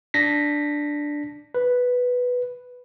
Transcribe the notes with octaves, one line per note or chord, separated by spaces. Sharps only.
D4 A#6 B6
B4